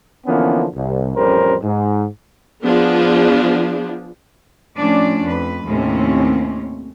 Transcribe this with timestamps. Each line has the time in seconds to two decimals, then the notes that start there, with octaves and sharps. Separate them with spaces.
0.26 D3 E3 F3 A#3 B3 C#4
0.75 C2
1.16 A1 F2 G3 C#4 A#4 C5
1.63 G#2
2.63 F3 B3 D4 G#4
4.76 A2 F3 A3 C#4 D4 D5
5.24 F2 B4
5.66 D#2 A2 C3 C4 C#4